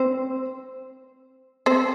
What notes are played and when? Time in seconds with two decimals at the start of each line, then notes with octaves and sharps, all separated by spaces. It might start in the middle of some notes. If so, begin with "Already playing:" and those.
Already playing: C4 C5
1.66 C4 C5